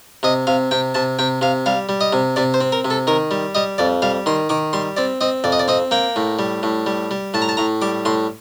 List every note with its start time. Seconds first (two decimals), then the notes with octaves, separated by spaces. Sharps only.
0.23 C3 D#5
0.47 C3 F5
0.71 C3 G5
0.94 C3 A5
1.19 C3 G5
1.41 C3 F5
1.66 G3 F5
1.89 G3
2.01 D#5
2.13 C3
2.36 C3 D5
2.54 C5
2.61 C4
2.72 A#4
2.85 C3
2.90 A4
3.07 D#3 A#4
3.31 G3
3.55 G3 D#5
3.78 F2 D5
4.02 G3 F5
4.26 D#3 C6
4.49 D#3 D6
4.73 G3 C6
4.97 C4 D5
5.21 C4 D#5
5.44 F2 D5
5.52 D#5
5.59 D5
5.68 C4 D#5
5.91 A#3 G5
6.16 A2
6.39 G3
6.63 A2
6.86 G3
7.11 G3
7.34 A2 A5
7.42 A#5
7.49 A5
7.57 A2 A#5
7.82 G3 D6
8.05 A2 C6